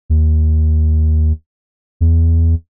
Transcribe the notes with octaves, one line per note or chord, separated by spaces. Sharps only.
D#2
E2